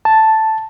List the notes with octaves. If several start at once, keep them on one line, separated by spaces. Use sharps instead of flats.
A5